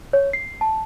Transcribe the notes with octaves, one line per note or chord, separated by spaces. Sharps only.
C#5
C7
A5